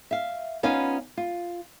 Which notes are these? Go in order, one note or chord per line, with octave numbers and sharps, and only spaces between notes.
E5 F5
B3 C#4 D#4 F4 F5
F4